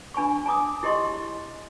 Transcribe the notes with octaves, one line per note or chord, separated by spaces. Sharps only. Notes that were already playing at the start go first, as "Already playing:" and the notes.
D4 G#5 B5 C#6
G#5 A#5 D6 D#6
E4 G4 D#5 C6 C#6